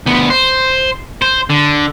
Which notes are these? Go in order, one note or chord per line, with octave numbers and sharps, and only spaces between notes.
D2 B3
C5
C5
D3